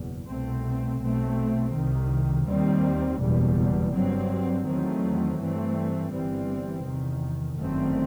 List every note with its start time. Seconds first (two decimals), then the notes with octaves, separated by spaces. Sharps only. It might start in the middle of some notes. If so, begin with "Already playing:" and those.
Already playing: F#1 E2 B2
0.29 C2 B2 A3 C4
1.03 B1 B2 A3 C4
1.75 C2 C3 D#3
2.48 D#2 D#3 G3 C4
3.21 F#1 E2 B2 G3
3.94 G2 F#3 C4
4.67 E2 D#3 F#3 A3 C4
5.40 G2 E3 A3 C4
6.13 G1 G2 E3 G3 C4
6.85 E2 C3 D#3
7.59 G1 F#2 D#3 A3 C4